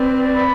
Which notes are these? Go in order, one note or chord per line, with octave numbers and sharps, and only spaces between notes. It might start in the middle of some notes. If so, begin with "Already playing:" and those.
Already playing: C4 B4 D5
B5